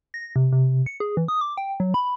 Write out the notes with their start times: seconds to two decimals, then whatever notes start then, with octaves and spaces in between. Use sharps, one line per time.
0.14 A#6
0.36 C3
0.52 C3
0.86 C#7
1.00 G#4
1.17 E3
1.28 D#6
1.41 D6
1.57 G5
1.80 F#3
1.94 B5